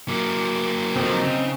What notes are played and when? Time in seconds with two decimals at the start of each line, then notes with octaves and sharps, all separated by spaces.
0.09 F#3 A#3
0.96 B1 F3 C4 D#4
1.24 C#3